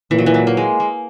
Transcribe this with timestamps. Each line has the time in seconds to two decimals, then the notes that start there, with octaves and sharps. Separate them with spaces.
0.11 A#2 E3
0.19 F#3
0.26 E3
0.34 F#3
0.47 A#3
0.57 G#3
0.80 A#3